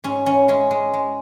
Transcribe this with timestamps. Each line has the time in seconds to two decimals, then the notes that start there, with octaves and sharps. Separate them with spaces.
0.04 G#2 C#4
0.26 E3 C#4
0.48 G#3 C#4
0.71 G#3
0.93 G#3